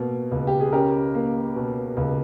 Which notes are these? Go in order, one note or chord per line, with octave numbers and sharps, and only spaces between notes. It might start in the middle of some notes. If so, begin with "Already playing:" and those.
Already playing: B2 A#3
C#2
G4
G#4
C#4 G4 A#4
A#3
B2
C#2